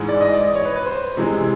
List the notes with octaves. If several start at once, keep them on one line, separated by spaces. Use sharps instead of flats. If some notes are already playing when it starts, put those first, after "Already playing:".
Already playing: G#2 E3 G#3
D5
D#5
D5
C#5
B4
B4
C5
C3 E3 G#3